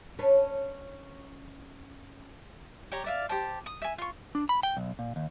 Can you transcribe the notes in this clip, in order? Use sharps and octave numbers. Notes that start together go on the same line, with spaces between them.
C#4 D4 B4
G4 C#5 A#5
D5 E5 F5
G4 C5 A5
D#6
E5 G#5
F4 C#6
D4
B5
G5
B1
A#2
D#2